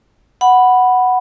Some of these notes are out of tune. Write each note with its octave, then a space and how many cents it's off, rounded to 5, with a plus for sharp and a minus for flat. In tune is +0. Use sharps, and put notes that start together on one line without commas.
F#5 +0 B5 +0